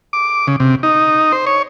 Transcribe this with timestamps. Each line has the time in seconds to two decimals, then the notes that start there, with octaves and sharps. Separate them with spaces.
0.13 D6
0.47 C#3
0.60 C3
0.83 D#4
1.32 C5
1.47 C#5